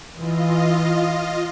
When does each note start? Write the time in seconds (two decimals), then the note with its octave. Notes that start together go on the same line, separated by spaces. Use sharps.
0.16 E3 F4 D#5